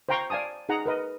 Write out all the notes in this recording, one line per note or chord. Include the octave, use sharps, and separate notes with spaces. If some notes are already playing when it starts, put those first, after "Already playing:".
C5 F5 G5 A#5 C6 C#6
D5 F5 G#5 A5 D#6
D#4 G#4 D#5 F#5 A#5
A#4 B4 D#5